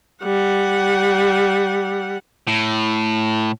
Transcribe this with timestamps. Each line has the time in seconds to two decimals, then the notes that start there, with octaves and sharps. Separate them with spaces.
0.24 G3 F#5
2.47 A2